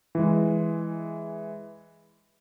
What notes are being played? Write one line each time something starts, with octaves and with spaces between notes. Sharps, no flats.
E3 G#3